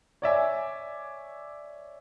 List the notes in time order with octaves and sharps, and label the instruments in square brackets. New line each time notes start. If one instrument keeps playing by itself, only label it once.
[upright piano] C#5 D5 E5 G#5